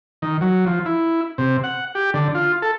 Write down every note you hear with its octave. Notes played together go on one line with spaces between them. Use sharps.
D#3
F#3
F3
E4
C3
F#5
G4
D3
F4
A4